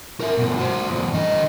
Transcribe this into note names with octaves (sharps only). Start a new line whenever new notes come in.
A#4 E5
G2 B2
F#4 C5
E2 G2
D3 D#5